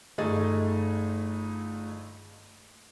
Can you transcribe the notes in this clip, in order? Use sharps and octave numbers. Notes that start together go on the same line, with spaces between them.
G1 A3 D#4 G#4 D#5 A6